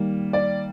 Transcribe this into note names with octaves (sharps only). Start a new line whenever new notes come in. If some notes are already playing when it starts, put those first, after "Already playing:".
Already playing: D#3 G3 A#3
D5